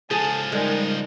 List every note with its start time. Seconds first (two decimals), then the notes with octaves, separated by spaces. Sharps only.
0.11 C#2 F3 G#4 A5
0.52 G3 G#3 D#4 A#4